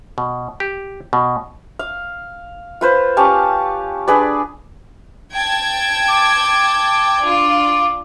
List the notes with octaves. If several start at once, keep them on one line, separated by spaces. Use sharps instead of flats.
B2
G4
B2
F5
F4 B4 C5
C#4 G4 F5 A5
D4 G#4 B4 D5
G5 A5 G#6
D6
D4 F4